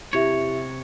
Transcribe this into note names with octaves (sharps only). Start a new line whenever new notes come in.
C3 E4 G4 C#5 E5